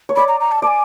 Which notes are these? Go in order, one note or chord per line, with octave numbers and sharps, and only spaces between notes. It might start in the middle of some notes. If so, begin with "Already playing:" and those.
C#5
D5 B5
A#5
A#5
A5
D5 A5
G#5